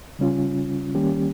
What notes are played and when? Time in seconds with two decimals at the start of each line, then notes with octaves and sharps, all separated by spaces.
0.19 C#3 G3 C#4 F4
0.95 D#3 G3 A#3 C#4 G4